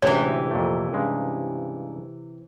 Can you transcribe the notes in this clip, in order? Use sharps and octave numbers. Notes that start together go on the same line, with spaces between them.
A1 D2 C3 E3 G#3 C#5
F2 A#2 A3
G2 C#3 G#3